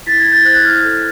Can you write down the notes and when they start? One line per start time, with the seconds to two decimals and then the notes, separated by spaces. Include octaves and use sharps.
0.06 E4 A6 B6
0.20 G#6 A#6
0.26 E4
0.32 G6 A6
0.45 C5 F#6 G#6
0.64 E4 F6 G6
0.84 A4